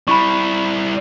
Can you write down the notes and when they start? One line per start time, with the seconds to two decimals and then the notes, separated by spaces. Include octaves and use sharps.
0.08 G3 E4 B5 C#6